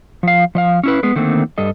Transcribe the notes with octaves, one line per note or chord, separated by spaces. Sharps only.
F3 F5
F3 D#5 F5
C#4 E4 B4
G#3 B3
D3 D#3 A3 A#3 C4
G2 G3 A4 D#5